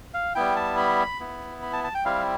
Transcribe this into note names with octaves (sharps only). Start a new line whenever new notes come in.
F5
G3 B3 E4 G5
A5
B5
B3 E4
B5
A5
A5
G5
G3 C4 E4 F5